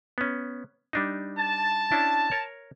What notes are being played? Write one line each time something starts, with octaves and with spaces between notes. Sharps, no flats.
B3 C#4
G3 D4 D#4
A5
C#4 D4 E4
A#4 C#5